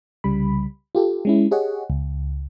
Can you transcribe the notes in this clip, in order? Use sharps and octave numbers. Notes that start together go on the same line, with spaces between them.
C2 C#3 G3 B5
F4 G4 A4
G#3 C#4 E4
G4 G#4 C#5 D#5 F#5
C#2